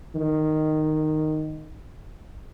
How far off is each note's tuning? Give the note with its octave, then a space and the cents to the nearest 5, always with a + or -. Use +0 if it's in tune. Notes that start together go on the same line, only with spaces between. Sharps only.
D#3 -10